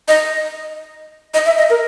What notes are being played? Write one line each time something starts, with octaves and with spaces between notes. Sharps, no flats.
D#5
D#5
E5
D#5
A#4